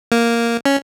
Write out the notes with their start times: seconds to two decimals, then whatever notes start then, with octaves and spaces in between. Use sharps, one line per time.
0.12 A#3
0.65 C#4